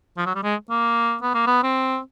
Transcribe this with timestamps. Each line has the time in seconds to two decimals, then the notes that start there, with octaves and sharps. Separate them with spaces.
0.18 F3
0.26 F#3
0.35 G3
0.43 G#3
0.70 A#3
1.22 B3
1.34 A#3
1.47 B3
1.63 C4